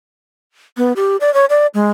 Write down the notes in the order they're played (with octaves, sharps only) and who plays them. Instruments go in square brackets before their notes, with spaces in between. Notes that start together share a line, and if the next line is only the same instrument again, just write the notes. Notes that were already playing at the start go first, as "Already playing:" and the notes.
[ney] B3
G4
D5
C#5
D5
G#3